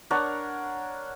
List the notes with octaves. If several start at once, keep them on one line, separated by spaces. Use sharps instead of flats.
D4 A#4 C#5 F#5